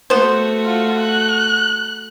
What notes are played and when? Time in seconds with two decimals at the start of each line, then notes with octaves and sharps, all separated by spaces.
0.10 A3 B3 F#4 C5
0.65 F4
1.01 F#6